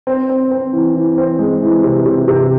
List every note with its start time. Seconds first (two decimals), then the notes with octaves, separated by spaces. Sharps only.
0.07 C4
0.29 C4
0.51 C4
0.73 E3
0.95 E3
1.18 C4
1.39 G#3
1.62 E3
1.84 C3
2.06 C3
2.28 C3